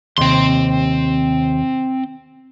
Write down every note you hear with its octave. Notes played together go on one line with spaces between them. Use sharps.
D#2 C3 C4 C6